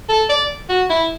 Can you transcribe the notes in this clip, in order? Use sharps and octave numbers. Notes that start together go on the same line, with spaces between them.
A4
D5
F#4
E4